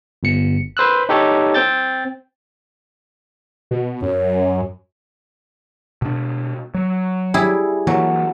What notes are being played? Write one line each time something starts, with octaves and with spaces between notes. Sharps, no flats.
G1 C#7
B4 C5 E6 F#6
D#4 G4 A4 C#5
C4 G5 G6 A6
B2
F#2 C#5
B2 D4
F#3
G3 E4 G#4
E3 F#3 A#3